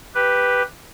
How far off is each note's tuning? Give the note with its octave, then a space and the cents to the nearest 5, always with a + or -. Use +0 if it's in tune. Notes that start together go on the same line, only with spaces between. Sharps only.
G4 +0 B4 +0